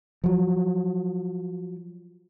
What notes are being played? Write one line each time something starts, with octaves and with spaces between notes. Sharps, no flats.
F3 F#3